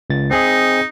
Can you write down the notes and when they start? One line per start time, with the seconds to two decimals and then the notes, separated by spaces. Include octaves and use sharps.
0.10 C#2 A6
0.31 C4 D#4 G#4 D#5